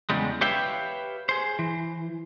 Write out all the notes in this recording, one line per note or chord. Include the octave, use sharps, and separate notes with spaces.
E2 C#3 G3 G#3
G4 B4 C#5 E5 F5 G5
G#4 C5
E3